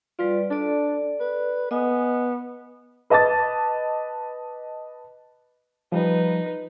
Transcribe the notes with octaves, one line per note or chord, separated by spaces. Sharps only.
G3 F4 B4 D5
D4 A4 D5
B4
B3 D#5 G#5 D#6
B4 D#5 A5 D6 A6
F3 G3 D#4 B4